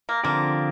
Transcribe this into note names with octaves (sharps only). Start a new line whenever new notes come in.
A#3
D3 F3 A#3 C4 G4 D5